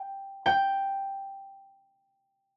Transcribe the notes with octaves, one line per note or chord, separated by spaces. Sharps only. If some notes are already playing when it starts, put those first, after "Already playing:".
Already playing: G5
G5